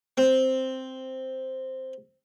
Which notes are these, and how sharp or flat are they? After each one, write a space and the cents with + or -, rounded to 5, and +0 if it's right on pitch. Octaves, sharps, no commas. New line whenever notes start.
C4 +0